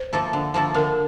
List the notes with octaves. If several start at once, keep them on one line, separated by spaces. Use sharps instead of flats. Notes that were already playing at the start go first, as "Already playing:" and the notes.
Already playing: C5
F3 A#3 E4 A4
D3
F3 A#3 E4 A4
D3 A#4